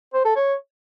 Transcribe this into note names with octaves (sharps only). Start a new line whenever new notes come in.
C5
A4
C#5